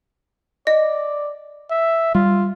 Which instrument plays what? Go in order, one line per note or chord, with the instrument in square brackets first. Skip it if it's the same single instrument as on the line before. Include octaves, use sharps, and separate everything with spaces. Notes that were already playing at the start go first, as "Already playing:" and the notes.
[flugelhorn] D5 [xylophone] D#5
[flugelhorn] E5
[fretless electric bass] G3 [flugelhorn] F4